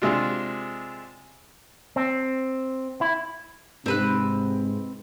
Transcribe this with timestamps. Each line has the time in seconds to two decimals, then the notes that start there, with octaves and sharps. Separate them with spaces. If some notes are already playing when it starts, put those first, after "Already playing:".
0.02 C3 G#3 D4 F4
1.96 C4
3.01 E4
3.86 G#2 C3 C4 B4 F#6